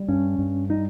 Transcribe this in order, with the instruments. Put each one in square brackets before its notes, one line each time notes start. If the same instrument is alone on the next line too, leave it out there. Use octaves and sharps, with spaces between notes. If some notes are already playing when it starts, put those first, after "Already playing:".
Already playing: [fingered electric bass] G3
[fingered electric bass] G2 [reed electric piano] C#4
[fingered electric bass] G2
[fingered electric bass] G3 [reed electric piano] D#4